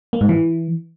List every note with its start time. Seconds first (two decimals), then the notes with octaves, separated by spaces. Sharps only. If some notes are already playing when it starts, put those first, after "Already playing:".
0.13 A#3
0.21 G#2
0.29 E3